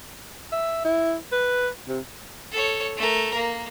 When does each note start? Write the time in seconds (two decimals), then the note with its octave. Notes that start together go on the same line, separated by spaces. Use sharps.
0.52 E5
0.85 E4
1.32 B4
1.89 C3
2.52 A4 C#5
2.97 A3 A#4
3.35 A#3